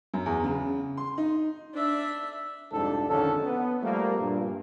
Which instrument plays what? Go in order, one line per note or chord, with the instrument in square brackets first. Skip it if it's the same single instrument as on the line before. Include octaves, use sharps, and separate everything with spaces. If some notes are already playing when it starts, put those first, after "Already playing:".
[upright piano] F#2
E2
C#3
C6
D#4
[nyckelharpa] D4 E5
[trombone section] C2 F2 G#2 C3 D4 A4
A#1 F2 D3 D#3 C#4 A4
B3
F3 G3 A3 A#3
G2 A#2